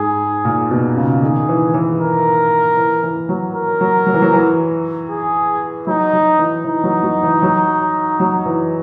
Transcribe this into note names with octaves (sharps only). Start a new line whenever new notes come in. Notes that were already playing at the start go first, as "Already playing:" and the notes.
Already playing: G#2 G#4
A#2
B2
C#3
D#3 G#4
E3
E3
A#4
E3
E3
F#3
A#4
F#3
F#3
E3
F#3
E3
G#4
F#3 D#4
F#3
E3
E3 D#4
F#3
F#3
E3
F#3
F#3
E3